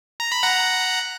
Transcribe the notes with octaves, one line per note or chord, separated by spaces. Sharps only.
A#5
B5
F#5 A#5